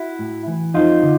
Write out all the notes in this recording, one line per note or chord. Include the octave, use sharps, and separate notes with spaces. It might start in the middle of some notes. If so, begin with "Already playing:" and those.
Already playing: E4 F#4
A2
E3
F2 D#4 F4
D3